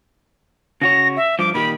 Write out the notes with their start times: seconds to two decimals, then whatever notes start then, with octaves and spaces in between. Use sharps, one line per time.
0.82 C#3 F#4 C#5 A#6
1.17 E5
1.39 G2 F3 D6
1.54 A#2 D#3 G4 B5